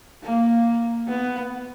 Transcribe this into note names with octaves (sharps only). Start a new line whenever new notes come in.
A#3
B3